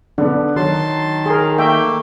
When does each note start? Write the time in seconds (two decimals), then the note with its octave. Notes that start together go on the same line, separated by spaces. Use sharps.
0.18 D3 B3 D4
0.56 D#3 F#3 A5 C6
1.26 G#4 A#4
1.58 A3 A#3 E5 G5